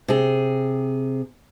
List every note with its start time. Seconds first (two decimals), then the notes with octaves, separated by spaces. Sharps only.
0.08 C3 G#4